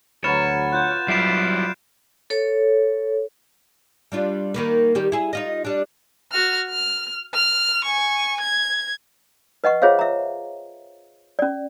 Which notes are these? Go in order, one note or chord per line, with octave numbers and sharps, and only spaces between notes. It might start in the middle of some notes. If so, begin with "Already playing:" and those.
D2 F#3 F#4 B4 C#5 F6 A6 E7
F4 F#5 F#6 G6
F#3 G3 E4 F4 G5 C7 D7 E7
A4 C#5
G3 D4 F4
D#3 A#3 B4
D#3 G3 G4
E4 G#4
D#4 F4 D#5
G3 D4
F#4 F6
F6
F6
G#5 C#6
G#6
B4 D#5 F#5 C#6
F4 G#4 C5 C#5 E5 F5
E5 A#5
C#4 D5